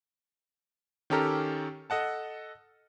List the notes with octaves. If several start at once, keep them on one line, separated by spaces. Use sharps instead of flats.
D#3 C#4 G4 A4 A#5 F6
A4 D#5 F#5 A5